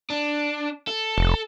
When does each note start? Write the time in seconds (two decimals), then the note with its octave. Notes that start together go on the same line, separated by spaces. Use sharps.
0.10 D4
0.87 A4
1.18 F1